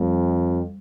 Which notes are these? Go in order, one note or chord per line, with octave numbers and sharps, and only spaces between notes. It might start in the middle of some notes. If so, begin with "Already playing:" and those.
Already playing: F2 G3